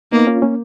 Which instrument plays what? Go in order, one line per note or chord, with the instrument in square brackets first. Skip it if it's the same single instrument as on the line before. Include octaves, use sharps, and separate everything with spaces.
[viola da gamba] A#3 [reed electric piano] B3 D#4
[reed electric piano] C#4 F4
A#3 C#4